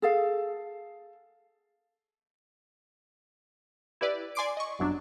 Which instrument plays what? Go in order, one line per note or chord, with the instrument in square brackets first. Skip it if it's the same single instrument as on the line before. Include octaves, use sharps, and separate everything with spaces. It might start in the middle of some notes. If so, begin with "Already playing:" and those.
[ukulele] G#4 A4 F5
[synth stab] E4 G4 B4 D5
D5 G#5 C6 D6 C7 D7
D#5 C#6
G1 F#2 F#3 D4